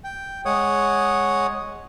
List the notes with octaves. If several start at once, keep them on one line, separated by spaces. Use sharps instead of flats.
G5
G#3 C#5 F#5 D#6